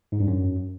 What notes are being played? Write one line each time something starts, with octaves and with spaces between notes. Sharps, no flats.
G#2
G2
F#2